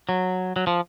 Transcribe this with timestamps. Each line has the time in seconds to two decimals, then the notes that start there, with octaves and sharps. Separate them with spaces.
0.09 F#3
0.56 F#3
0.67 F3